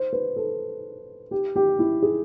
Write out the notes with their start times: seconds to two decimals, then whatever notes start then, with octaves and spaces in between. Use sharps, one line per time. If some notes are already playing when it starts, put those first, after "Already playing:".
Already playing: C5
0.13 B4
0.36 A4
1.31 G4
1.56 G4
1.79 E4
2.02 G#4